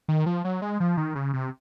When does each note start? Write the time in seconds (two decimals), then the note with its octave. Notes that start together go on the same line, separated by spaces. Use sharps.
0.08 D#3
0.26 F3
0.45 F#3
0.62 G#3
0.80 F3
0.97 D#3
1.15 C#3
1.33 C3